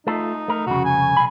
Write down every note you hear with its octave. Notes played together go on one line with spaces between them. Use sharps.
A3 D#4 F4 A4
A3 A#4
C2 F2 C#3 F#4
G#5
B1 B5